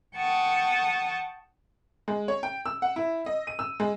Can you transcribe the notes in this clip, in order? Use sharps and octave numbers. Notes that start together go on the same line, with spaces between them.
F#5 G5 A5 C#6 D#6
G#3
C#5
G5
E6
F#5
E4
D#5
D#7
E6
G#3